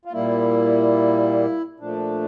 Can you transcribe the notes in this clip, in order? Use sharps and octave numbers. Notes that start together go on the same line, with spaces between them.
F4
A#2 G3 A#3 E4
A#2 F3 A3 D4